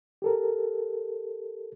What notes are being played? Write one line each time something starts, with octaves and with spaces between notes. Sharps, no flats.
G4 A4 A#4